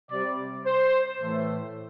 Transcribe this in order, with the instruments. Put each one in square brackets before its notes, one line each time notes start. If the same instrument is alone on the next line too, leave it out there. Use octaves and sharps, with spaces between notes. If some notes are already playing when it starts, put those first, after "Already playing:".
[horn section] C3 G3 D5
C5
A2 E3 A3